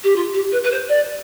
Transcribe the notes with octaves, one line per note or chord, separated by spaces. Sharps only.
G4
F4
G4
B4
B4
C5
D5